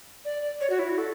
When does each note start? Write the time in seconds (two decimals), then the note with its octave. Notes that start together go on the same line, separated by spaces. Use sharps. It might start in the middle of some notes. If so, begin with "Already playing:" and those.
0.25 D5
0.61 C#5
0.70 F#4
0.79 E4
0.89 F#4
0.98 A4